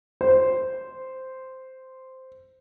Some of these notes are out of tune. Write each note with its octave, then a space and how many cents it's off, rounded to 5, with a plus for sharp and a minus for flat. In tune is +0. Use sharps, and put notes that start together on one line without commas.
C5 -5